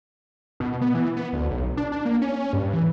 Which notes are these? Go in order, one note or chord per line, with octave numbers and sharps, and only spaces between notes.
B2
B3
E3
B3
D2
B1
D4
D4
A#3
C#4
G2
E3